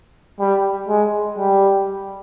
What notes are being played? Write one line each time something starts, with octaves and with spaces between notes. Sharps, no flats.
G3
G#3
G3